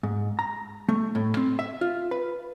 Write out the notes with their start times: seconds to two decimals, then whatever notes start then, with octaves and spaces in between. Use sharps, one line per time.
0.03 G#2
0.39 A#5
0.89 A3
1.15 A2
1.37 C4
1.59 E5
1.81 F4
2.11 B4